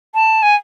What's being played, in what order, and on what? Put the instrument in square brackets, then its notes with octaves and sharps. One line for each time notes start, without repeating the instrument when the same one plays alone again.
[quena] A5
G#5